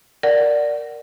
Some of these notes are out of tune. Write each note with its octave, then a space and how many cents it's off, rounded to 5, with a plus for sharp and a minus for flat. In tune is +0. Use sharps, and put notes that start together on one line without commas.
A#4 +0 D5 +0 F#5 +5